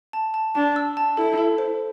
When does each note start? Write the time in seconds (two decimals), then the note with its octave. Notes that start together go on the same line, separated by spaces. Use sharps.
0.13 A5
0.34 A5
0.55 D4 A5
0.76 E6
0.97 A5
1.17 E4 A4
1.38 A4
1.58 C5